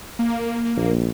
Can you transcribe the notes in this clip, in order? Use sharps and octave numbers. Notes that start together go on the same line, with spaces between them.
A#3
A#1